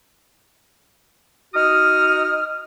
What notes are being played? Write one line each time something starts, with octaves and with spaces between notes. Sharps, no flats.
D#4 F#4 D#6 F6